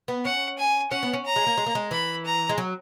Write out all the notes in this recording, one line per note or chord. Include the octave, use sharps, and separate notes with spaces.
B3
C#4 F#5
G#5
C#4 F#5
B3
C#4
A#5
G#3
A#3
G#3
A#3
G#3
E3 B5
A#5
G#3
F#3